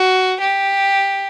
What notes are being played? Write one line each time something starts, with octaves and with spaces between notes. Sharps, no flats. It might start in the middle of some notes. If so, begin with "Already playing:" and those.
Already playing: F#4
G4